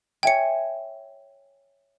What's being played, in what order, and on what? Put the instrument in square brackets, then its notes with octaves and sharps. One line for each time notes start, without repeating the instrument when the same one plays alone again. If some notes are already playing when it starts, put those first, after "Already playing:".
[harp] C#5 E5 G#5 [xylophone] G5 C#7